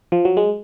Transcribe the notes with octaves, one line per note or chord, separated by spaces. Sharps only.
F3
F#3
G#3